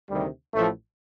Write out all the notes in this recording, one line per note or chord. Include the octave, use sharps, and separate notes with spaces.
D2 C3 D#3 G3
A1 A2 F3 A3